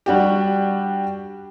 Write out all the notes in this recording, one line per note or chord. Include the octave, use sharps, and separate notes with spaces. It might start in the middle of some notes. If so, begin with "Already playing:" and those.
G3 D4 F#4 G4